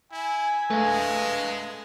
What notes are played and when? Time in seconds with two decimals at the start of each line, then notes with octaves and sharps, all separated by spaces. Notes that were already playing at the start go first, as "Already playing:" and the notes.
0.12 E4 G#5
0.70 G#3 A3 B4 F5